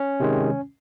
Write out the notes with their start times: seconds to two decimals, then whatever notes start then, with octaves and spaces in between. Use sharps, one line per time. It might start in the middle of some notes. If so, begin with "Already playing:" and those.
Already playing: C#4
0.20 C3 D#3 G#3